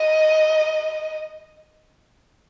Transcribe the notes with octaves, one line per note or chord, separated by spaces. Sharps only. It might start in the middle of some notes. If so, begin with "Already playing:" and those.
Already playing: D#5